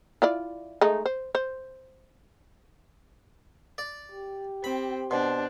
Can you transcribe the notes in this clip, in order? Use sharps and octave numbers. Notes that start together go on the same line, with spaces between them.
E4 F4 D5
G#3 A3 D#4
C5
C5
D5
G4
C4 B5
B2 D4 C5 A5 C6